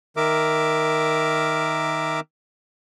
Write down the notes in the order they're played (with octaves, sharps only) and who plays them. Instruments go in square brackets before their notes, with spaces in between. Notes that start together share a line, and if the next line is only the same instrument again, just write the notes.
[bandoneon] D#3 A#4 E5 D6